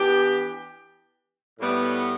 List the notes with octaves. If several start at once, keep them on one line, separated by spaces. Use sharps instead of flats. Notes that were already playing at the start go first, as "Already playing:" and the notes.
Already playing: E3 B3 D4 G4
A2 G3 B3